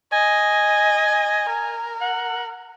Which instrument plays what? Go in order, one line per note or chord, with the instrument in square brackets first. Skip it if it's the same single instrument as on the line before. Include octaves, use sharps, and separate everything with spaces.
[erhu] D#5 [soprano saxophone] G#5
[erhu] A#4
[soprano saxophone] F#5